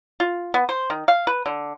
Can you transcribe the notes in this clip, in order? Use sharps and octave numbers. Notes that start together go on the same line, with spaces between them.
F4
B3
C5
D#3
F5
B4
D3